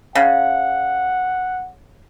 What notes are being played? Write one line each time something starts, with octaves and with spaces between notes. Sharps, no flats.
C#3 F#5